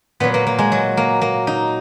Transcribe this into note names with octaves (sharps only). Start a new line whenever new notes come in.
A#2 F#3 B3
A#3
A#3
G#3
F#3
A#3
A#3
D#4